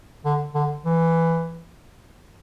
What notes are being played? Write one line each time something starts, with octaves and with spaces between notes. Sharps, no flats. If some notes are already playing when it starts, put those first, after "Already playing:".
D3
D3
E3